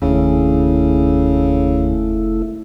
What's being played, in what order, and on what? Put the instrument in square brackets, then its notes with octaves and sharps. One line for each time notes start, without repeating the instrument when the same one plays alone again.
[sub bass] F1 [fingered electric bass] D#2 D4 [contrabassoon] C#3 [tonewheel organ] A3 E4